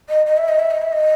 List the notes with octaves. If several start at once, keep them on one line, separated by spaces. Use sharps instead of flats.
D#5
D#5
E5
D#5
E5
D#5
E5
D#5